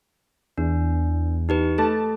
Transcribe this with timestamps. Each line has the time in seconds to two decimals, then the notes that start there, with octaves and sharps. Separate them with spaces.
0.58 E2 D4
1.49 D#4 G4 B4
1.78 A3 A4 A5